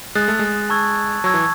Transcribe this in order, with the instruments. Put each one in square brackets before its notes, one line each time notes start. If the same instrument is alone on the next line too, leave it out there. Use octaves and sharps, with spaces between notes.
[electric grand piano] G#3 [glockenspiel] D#6 F#6 A6
[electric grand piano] A3
G#3
[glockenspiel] A5 C#6 E6 G#6
[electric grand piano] F#3 [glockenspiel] A5 C#6 E6 G#6
[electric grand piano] E3